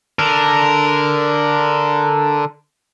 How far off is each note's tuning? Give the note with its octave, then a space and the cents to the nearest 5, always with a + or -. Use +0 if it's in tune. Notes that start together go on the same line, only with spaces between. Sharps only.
D3 +0 A#4 +0